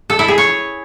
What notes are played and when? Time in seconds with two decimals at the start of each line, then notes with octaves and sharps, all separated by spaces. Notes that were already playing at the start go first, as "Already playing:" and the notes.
0.10 A4
0.19 E4
0.28 G#4
0.38 C#5